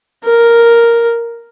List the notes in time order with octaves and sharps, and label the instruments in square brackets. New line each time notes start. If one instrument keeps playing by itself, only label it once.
[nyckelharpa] A#4